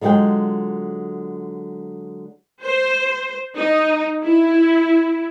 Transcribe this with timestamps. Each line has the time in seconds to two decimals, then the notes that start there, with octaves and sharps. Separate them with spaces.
0.01 D3 F#3 G#3 F4 G5
2.62 C5
3.56 D#4
4.23 E4